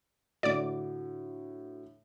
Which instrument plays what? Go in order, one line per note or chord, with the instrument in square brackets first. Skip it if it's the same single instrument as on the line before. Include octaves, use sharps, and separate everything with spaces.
[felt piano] A2 D3 [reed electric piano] F#4 [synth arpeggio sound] D5 D6